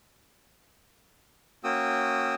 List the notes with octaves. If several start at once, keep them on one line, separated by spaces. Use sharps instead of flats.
A#3 C#4 F#4 G5 D#6 E6